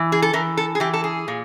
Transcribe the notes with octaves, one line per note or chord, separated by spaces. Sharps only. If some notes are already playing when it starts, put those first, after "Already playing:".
Already playing: E3
G#4
A4
E3 A#4
A4
G#4
E3 G4
A4
G#4
A#2